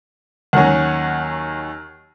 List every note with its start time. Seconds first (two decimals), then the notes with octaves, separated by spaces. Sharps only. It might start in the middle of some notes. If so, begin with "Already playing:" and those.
0.53 D#2 D#3 F#3 C#4 F#5